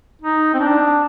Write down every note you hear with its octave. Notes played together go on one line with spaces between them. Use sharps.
D#4
C4
D4